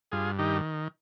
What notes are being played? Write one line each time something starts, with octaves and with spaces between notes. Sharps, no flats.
G2 F4 G#4
D#3 D#4 G4